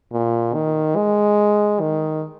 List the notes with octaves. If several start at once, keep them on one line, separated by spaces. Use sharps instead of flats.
A#2
D#3
G#3
D#3